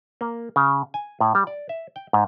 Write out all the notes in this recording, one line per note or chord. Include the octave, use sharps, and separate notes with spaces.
A#3
C#3
G#5
A2
G3
D5
E5
G5
G#2